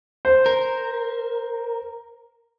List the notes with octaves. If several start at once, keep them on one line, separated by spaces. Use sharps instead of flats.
C5
A#4